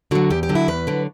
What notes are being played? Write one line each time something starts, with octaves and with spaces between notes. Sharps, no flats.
D3 F#3 F#4
E2 G4
G4
D3 F#3
E4
E2 B4
D3 F#3